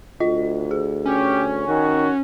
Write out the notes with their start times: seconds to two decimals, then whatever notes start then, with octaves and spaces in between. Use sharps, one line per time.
0.20 D2 F4 D#5
0.71 G#4
1.06 C#4 G4
1.68 D#3 F#4